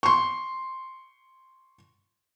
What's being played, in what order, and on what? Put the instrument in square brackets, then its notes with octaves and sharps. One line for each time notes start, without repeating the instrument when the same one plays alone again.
[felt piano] C6 C#6